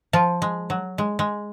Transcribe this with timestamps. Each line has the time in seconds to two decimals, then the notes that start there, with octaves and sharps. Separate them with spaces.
0.13 F3 F4
0.42 G#3
0.70 F#3
0.98 G#3
1.19 G#3